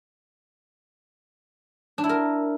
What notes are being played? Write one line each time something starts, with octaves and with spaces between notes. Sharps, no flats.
D4
E4
A#4